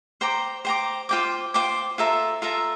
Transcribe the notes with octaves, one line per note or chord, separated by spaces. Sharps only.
C5 G5 A#5 D6
C5 G5 A#5 D6
F4 C5 G5 D6
F4 C5 G5 D6
F4 A4 E5 A#5
F4 A4 E5 A#5